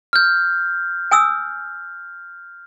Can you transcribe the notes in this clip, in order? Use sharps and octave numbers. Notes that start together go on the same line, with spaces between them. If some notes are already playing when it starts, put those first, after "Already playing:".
F6 G6
G#5 D#6 E6